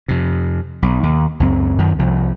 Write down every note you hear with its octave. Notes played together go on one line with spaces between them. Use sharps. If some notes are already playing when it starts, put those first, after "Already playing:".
F2 C3
B1
D#2
C#2 F#2 C4
F#2 D#3
C2 F3